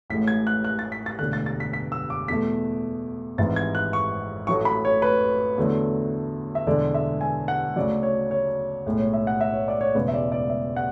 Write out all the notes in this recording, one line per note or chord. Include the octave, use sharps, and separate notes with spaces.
A1 A2 G#3 B6
G#6
F#6
F#6
A6
B6
A6
E1 D2 D3 F#6
A6
A6
B6
B6
E6
D6
E2 B2 A3 B6
G#1 G#2 E3 G#3 A6
G#6
F#6
C#6
A1 A2 F#3 A3 C#6
B5
C#5
B4
E2 D3 F#3 A3
E5
E1 E2 D3 G#3 D5
E5
G#5
F#5
D2 C#3 F#3 D5
C#5
C#5
B1 A2 G#3
C#5
E5
F#5
E5
C#5
D5
C#5
E1 E2 C#3 G#3 B4
E5
D5
D5
E5
F#5